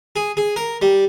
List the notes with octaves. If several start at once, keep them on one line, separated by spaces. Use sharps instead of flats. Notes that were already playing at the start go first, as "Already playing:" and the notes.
G#4
G#4
A#4
G3